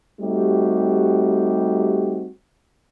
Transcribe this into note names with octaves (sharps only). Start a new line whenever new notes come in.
G3 A3 C4 D#4 F#4 G4